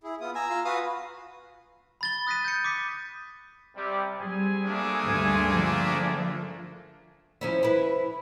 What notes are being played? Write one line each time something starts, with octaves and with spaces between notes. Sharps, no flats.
E4 G#4
B3 F4 D#6
G#5 A#5 E6
F4
F#4 B4 F5 D#6
B5 A6 G7
D#6 F#6 A#6 B6 D#7
G6 C#7
D6 D#6 B6
C3 G3
G3 C4 G#4 G#5
A3 A#3 D4
D2 G2
D3 F3
F3 C#4 E4
E4 B4